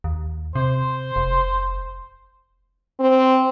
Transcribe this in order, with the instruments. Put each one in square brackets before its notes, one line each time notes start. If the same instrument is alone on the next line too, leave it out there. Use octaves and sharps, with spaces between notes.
[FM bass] D#2
[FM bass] C3 [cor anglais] C5
[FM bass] F1
[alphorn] C4